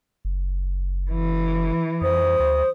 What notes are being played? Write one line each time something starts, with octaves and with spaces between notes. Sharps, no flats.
F#1
E3
F2 C5 D#6
D2